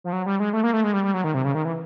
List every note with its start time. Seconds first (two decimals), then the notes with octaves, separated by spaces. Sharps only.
0.04 F3
0.13 F#3
0.26 G3
0.40 G#3
0.53 A3
0.63 A#3
0.73 A3
0.84 G#3
0.94 G3
1.04 G3
1.14 F#3
1.24 D#3
1.34 C3
1.44 C#3
1.55 D#3
1.65 E3